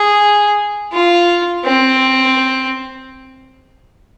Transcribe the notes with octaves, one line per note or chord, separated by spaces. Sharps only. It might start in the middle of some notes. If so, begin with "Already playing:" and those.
Already playing: G#4
F4
C4